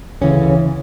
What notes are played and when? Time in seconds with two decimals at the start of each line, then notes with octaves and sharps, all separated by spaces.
0.21 D2 C#3 E3 C#4